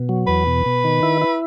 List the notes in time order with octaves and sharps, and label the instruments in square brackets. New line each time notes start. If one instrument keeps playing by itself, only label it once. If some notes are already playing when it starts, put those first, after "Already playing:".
Already playing: [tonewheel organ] B2
F#3
[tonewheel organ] E2 [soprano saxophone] B4
[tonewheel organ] B2
B2
D#3
E4
E4